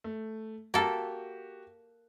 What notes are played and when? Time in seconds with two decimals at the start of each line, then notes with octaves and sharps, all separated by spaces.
0.04 A3
0.74 A#3 F#4 G4 A4